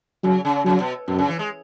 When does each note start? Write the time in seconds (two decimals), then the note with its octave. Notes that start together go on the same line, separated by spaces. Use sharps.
0.24 C#3 F#3
0.45 C#3
0.65 C#3 F#3
0.80 B2
1.08 F#2 B2
1.19 C#3
1.28 E3
1.39 G#3